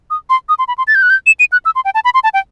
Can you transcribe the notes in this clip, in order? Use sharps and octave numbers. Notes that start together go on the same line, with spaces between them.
D#6
C6
D#6
C6
B5
C6
A6
G6
F#6
G6
E7
D#7
F#6
E6
C6
G5
A5
B5
C6
A5
G5